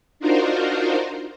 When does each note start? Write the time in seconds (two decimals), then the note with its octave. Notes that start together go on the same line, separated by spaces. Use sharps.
0.20 D4 D#4 F4 F#4 A#4 C5